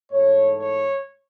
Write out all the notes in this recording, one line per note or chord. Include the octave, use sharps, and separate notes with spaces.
G#2 E3 A3 C#5
C#5